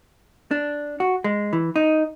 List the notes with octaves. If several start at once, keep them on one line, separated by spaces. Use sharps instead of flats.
D4
F#4
G#3
E3
D#4